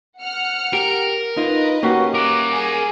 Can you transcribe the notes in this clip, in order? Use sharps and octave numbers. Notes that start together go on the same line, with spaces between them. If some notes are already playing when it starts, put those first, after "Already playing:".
F#5 F6 C#7
G4 A#4
D#4 F4 B4 D#5
A#3 C#4 F#4 G4
A#4 F#5 D6
G#4